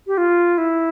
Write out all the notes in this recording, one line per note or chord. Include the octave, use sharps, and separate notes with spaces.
G4
F4
E4